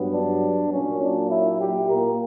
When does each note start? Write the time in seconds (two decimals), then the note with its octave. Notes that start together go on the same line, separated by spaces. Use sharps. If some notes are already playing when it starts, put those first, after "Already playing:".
Already playing: G2 F#3 B3
0.15 D4
0.73 A#2 F#3 A#3 C#4
1.02 D4
1.31 E4
1.61 G4
1.90 A#2 A#3 A#4